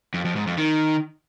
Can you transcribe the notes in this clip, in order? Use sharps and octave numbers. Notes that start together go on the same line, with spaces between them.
F2
F2
G#2
F2
D#3